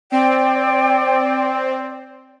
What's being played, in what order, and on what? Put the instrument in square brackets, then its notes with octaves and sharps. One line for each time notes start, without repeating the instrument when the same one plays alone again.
[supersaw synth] C4 [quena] D5 [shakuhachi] G5